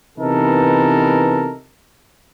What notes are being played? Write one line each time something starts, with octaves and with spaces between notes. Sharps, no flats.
C3 E3 B3 D#4 A4 A#4